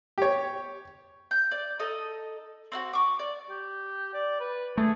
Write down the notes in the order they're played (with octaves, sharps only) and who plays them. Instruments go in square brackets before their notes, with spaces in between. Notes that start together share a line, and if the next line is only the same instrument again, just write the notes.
[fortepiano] G4 C#5
[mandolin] G6
D5
D#4 A4 D#5
C4 D#4 F#4
C#6 D6
D5
[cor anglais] G4
D5
B4
[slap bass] A3 [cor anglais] G#4